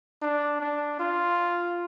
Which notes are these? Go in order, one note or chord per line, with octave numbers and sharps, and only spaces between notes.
D4
D4
F4